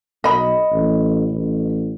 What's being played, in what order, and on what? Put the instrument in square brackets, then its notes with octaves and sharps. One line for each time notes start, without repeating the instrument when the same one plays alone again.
[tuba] B1 [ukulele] D#5 B5
[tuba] A1
A1